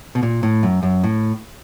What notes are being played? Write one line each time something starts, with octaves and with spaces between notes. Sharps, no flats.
B2
A#2
A2
F#2
F#2
A2